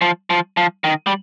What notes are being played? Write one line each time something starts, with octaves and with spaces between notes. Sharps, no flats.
F3
F3
F3
D#3
G3